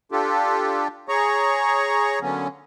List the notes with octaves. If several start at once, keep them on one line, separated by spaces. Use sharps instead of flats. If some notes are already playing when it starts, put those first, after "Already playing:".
D4 F4 G4 A4
G#4 C#5 A#5 C#6
D3 F#3 A#3 B3 C#4